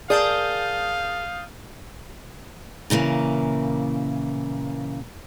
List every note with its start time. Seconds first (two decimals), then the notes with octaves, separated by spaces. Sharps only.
0.10 G#4 A#4 D5 F5 A5 D#6 G6 A6
2.90 A#2 C#3 E3 A#3